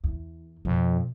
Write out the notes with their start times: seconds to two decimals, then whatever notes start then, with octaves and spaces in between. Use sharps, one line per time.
0.04 E2
0.65 F2 B2